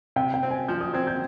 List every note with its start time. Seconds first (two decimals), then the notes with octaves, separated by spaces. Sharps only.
0.16 C3 G5
0.34 G5
0.43 C4
0.51 G#5
0.68 F3 G6
0.81 D#6
0.94 C4 G#6
1.07 G6